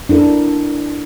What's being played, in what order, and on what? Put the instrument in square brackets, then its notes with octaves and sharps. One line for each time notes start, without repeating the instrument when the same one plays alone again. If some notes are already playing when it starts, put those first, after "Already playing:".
[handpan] D4 E4 A4 A#4